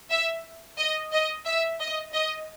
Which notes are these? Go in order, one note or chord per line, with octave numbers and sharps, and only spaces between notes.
E5
D#5
D#5
E5
D#5
D#5